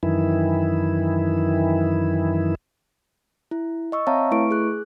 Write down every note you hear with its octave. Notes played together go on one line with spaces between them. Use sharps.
F#2 D#3 E3 E4
E4
D#5 C#6 E6
C4 C#5 E5 F5 A5 A#5
A3 E4 B4 C#6 D7
G#4 F#6